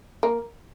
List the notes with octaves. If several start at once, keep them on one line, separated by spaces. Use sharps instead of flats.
A#3